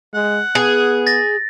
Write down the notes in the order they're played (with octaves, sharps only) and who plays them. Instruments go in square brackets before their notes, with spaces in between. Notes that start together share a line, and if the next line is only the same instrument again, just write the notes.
[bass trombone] G#3 [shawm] F#5
[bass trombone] B3 [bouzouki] G#4
[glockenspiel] A6 A#6